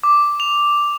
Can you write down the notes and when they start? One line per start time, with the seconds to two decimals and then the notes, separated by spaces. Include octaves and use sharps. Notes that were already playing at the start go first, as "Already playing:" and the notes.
0.03 D6
0.40 F7